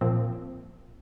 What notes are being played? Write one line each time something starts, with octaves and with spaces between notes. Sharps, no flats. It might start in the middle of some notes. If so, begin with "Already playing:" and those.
A#2 F3 A#3 C4